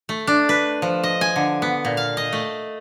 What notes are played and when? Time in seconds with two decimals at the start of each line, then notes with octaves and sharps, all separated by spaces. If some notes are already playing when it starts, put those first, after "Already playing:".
0.09 A3
0.27 D4
0.49 B4
0.82 F3
1.04 D#5
1.21 G#5
1.36 D3
1.62 B3
1.85 A#2
1.97 F5
2.17 D#5
2.33 A3